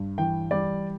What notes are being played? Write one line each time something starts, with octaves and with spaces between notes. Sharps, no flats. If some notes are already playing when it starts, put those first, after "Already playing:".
Already playing: G2
E3 G5
G3 D5